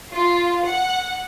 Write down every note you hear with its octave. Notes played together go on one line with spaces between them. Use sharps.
F4
F#5